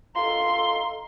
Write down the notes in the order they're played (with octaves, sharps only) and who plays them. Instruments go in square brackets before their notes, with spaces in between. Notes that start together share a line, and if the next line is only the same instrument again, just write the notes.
[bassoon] F4 [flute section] A4 D#5 A#5 [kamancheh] C6